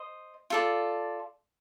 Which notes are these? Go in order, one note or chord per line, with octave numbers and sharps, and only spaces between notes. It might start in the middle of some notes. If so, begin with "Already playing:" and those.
Already playing: C5 D#5
F4 A4 D5